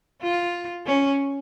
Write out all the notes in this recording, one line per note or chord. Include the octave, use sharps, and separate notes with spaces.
F4
C#4